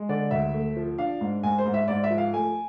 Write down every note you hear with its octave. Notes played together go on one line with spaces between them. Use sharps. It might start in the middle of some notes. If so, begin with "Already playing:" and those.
Already playing: G#3
D3 D5
D2 E5
A3
F3
D4 F5
G#2
G#2 G#5
C5
G#2
E5
G#2 D5
E5
F3
F5
A3 G#5